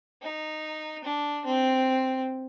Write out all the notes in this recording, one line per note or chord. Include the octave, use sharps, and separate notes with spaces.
D#4
D4
C4